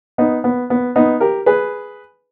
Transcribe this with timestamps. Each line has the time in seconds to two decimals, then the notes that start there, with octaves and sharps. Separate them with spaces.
0.18 B3 D#4
0.44 B3
0.70 B3
0.96 B3 D#4
1.20 G4 A#4
1.46 G#4 B4